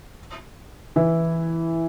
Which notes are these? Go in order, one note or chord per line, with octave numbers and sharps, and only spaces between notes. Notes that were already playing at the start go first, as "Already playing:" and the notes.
E3 E4